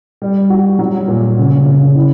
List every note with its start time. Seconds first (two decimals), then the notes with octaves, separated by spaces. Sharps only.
0.22 G3
0.50 F#4
0.79 F#3
1.08 A#2
1.38 C#3
1.66 C#3
1.95 E4